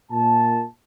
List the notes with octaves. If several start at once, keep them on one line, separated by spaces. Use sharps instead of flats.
A#2 A5